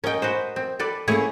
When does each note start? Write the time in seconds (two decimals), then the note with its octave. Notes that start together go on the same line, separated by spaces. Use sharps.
0.04 C#4 A#4 D#5 G5
0.22 F#4 B4 C5
0.56 C4
0.79 A4 B4 D5
1.08 A3 A#3 C#4 E4 G#4 C#5